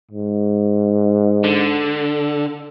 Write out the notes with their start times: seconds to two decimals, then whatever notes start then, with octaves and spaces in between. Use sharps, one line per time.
0.11 G#2
1.44 D3